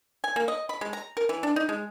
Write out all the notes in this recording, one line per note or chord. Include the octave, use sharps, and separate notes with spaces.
G#5
A#3
D#5
B5
G#3
A#5
A#4
E3
D4
D#4
G#3